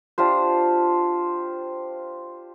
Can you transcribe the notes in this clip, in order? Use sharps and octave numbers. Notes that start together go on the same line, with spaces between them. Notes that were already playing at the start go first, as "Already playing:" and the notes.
D4 F4 G4 C5